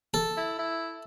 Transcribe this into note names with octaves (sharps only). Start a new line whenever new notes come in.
A4
E4
E4